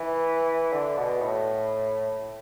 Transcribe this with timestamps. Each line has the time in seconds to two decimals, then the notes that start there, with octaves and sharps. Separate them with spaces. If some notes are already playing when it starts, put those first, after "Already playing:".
Already playing: E3
0.73 D3
0.97 B2
1.21 A2